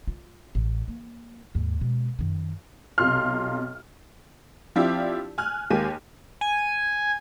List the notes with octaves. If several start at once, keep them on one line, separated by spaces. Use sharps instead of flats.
F4
A1
A#3
D#2 G#2
B2 G#3
F#2 D#3
B1 C3 F4 C6 F6
F3 C4 D4 E4 F4 G4
G#5 F6 F#6
D#2 G#3 A#3 G4 G#5 D#7
G#5